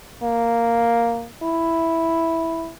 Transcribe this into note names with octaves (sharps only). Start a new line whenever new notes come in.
A#3
E4